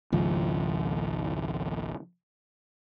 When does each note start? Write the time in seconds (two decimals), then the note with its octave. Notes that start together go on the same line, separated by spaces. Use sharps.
0.12 G#1 C#2 F3